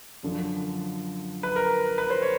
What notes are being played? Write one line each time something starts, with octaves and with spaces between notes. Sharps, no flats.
F#2 D3 F3
B4
A#4
B4
C5
C#5